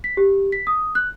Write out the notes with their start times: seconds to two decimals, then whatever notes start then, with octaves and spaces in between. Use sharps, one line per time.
0.04 B6
0.17 G4
0.52 B6
0.67 D#6
0.95 F#6